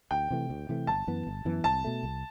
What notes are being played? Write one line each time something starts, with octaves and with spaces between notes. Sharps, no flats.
D2 G5
C3 E3 A3
D2
C3 E3 A3
G1 A5
F#2 E3 B3
G1
F#2 E3 B3
C2 A5
B2 A3
C2